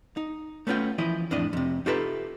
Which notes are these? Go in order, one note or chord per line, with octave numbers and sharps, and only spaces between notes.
D#4
A3 B3 C#4 F4 G5
E3 F3 E4 D#5
F2 A2 D4 E4 D#5
F2 C3
D#4 F4 G4 A4 B4 E5